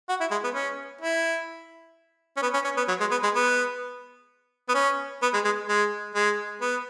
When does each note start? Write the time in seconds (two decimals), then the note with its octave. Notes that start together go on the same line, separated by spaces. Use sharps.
0.09 F#4
0.20 E4
0.31 G#3
0.44 B3
0.54 C#4
1.01 E4
2.37 C#4
2.42 B3
2.54 C#4
2.64 C#4
2.77 B3
2.88 F#3
3.00 G#3
3.11 B3
3.23 G#3
3.35 B3
4.69 B3
4.74 C#4
5.22 B3
5.33 G#3
5.45 G#3
5.69 G#3
6.15 G#3
6.61 B3